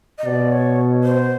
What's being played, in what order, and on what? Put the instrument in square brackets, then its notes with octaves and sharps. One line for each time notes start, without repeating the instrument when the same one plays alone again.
[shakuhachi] D#5
[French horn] B2 [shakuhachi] D5
[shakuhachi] C#5
C5